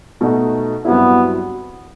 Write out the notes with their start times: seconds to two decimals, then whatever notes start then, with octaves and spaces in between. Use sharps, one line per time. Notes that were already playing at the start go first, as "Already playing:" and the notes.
0.21 B2 A3 D#4 F#4
0.85 G2 F#3 B3 C4 E4